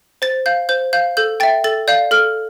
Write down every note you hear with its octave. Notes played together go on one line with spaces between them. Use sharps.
C5 A6
F5 G6
C5 G6
F5 G6
A4 G6
E5 G5 A6
A4 A6
D5 F5 G6
A4 F6